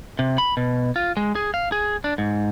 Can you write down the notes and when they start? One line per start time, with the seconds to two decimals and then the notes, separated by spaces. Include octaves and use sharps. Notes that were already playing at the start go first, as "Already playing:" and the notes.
0.19 C3
0.38 B5
0.57 B2
0.96 F4
1.17 G#3
1.35 G#4
1.54 F5
1.72 G#4
2.04 D4
2.18 G#2